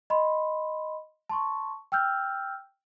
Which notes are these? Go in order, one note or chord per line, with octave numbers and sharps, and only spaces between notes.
D#5 B5 C6
A5 C6 C#6
G5 E6 F6 G6